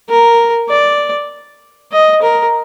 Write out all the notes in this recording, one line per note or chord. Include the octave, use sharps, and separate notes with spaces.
A#4
D5
D#5
A#4